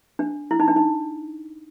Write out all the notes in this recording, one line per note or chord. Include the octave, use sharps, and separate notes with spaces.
D4
E4
D#4
D4
D#4